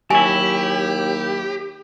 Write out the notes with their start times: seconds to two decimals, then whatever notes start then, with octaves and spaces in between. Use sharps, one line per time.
0.10 D#2 F#3 E4 G4 G#5